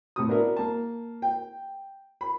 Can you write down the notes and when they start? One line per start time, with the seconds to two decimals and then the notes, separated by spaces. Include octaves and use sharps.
0.16 A2 C3 D#6
0.29 B3 D4 E4 F#4 A#4
0.57 A#3 A5
1.22 G5
2.21 B5